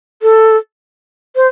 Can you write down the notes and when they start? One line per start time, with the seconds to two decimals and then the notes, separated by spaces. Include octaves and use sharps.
0.22 A4
1.36 C5